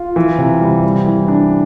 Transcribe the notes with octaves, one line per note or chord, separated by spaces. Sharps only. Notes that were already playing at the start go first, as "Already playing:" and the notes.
Already playing: F4
E3
C3
G3
G3
E3
D4